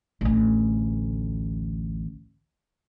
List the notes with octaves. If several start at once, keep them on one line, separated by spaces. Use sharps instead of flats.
A1 D2